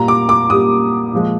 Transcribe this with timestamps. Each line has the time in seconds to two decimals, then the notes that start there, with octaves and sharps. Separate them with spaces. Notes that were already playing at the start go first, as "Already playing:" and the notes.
Already playing: A#2 G3 A#5
0.08 D6
0.29 D6
0.50 A#2 G3 D#6
1.13 A#2 F3 G#3